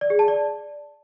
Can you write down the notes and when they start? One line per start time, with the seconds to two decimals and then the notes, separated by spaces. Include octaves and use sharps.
0.01 D5
0.10 G#4
0.19 A5
0.28 D5